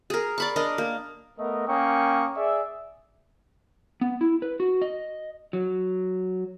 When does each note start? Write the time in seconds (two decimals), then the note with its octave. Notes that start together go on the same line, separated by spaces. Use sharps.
0.10 G#4 A#4
0.38 D5 B5 C#6
0.56 D4 A#4 D#5
0.78 A#3
1.39 A3 B3 A#4 D#5
1.68 A#3 C#4 G5 C#6 D#6
2.36 G#4 D5 E5
4.01 B3
4.21 E4
4.42 B4
4.60 F#4
4.82 D#5
5.53 F#3